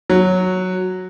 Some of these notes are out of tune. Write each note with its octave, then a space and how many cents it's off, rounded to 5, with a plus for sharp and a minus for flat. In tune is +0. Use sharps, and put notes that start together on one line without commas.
F#3 -5